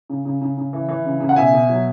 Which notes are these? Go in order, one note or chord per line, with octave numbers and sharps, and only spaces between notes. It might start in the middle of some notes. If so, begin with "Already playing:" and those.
C#3
C#3
C#3
C#3
E3
E3
C#3
C#3
F#5
B2 E5 G#5
B2
F#3